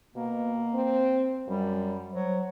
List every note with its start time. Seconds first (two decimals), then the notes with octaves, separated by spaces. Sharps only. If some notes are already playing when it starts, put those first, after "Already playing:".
0.15 B2 A#3
0.74 C4
1.48 F#2 G3
2.13 F#3 C5